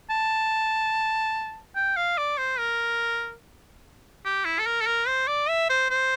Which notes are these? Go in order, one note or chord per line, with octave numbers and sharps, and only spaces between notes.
A5
G5
F5
D5
C5
A#4
G4
E4
A4
A#4
A4
A#4
C5
D5
E5
C5
C5